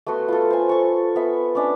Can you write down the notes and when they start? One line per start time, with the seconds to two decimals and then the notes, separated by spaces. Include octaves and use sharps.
0.07 A3 B3 F#4 C6
0.28 F4 A4
0.51 C5 G#5
0.69 A4 C#6
1.16 B3 E5
1.55 C#4 D4 E5